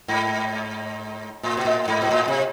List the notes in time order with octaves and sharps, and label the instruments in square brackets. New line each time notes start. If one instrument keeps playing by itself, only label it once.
[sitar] G#2
A2
B2
A2
G#2
B2
A2
C3